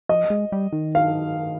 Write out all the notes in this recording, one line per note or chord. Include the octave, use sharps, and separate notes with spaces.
F3 D#5
G#3
G3
D#3
F5